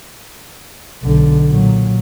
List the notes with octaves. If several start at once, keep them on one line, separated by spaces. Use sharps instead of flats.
B1 D3
A#2 F#3